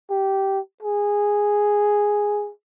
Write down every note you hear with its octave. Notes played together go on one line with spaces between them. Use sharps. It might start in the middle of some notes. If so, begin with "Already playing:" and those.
G4
G#4